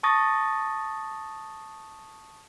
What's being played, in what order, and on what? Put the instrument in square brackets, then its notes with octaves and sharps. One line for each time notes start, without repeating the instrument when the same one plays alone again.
[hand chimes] A5 C#6 D#6 A6 A#6